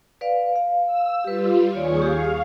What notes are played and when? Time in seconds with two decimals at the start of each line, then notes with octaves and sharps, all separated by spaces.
0.21 B4 D5 F5
0.56 F5
0.86 E6
1.24 G3 F4 G4 B4
1.73 D#2 F4 G#4 C#5 D5 C#6
2.02 G4 G#4 F5